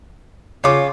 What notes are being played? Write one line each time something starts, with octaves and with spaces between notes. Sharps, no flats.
C#3 F4 C#5 D6